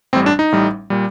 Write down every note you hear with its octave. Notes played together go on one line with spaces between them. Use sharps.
A1 A2 G3 C4
D4
D#4
A1 A2 G3
A#2 G3